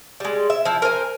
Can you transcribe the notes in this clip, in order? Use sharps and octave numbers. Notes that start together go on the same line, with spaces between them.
G3 G#3
E5
F3 E4
A#4 C5 G#5